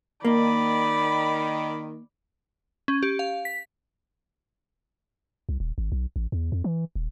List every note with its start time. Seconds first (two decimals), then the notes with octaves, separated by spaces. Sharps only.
0.25 D#3 A#3 D5 B5
2.88 C#4
3.03 G4
3.19 F5
3.45 B6
5.49 C2
5.60 D#1
5.78 G#1
5.92 B1
6.16 A1
6.32 E2
6.52 F2
6.64 E3
6.96 D#1